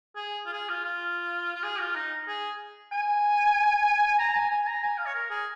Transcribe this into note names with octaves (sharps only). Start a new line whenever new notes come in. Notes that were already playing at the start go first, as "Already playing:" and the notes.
G#4
F4
G#4
F4
F4
F4
G#4
F4
D#4
G#4
G#5
A#5
G#5
G#5
A#5
G#5
F5
C#5
A#4
G#4